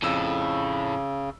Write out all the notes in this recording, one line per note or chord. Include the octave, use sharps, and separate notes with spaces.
F2 A2 C#3 E6